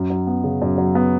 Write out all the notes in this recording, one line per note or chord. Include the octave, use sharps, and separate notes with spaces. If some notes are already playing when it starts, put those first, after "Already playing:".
Already playing: F#2
F#3
B3
C#3
F#2
F#3
B3